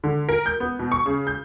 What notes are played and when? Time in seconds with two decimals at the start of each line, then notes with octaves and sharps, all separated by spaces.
0.04 D3
0.29 A#4
0.46 G6
0.60 B3
0.79 B2
0.92 C#6
1.06 C#3
1.27 G6